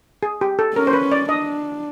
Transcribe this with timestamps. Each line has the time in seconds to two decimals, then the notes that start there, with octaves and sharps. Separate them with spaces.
0.23 G#4
0.41 G4
0.59 A4
0.76 C#4 A#4
0.87 C5
0.93 B4
1.12 D5
1.29 D4 D#5